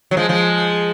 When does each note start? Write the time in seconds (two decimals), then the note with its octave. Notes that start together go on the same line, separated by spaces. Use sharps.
0.11 F#3
0.17 F3 G#3
0.29 F3 G#3